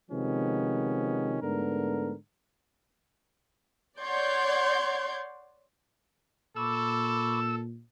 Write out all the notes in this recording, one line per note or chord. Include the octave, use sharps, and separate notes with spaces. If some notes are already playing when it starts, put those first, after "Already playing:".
C3 D#3 F3 G#3 B3 C#4
G#2 D3 A3 B3 A#4
C#5 D5 F#5 C6 G6 G#6
A#2 A4 B5 C#6 D6 E6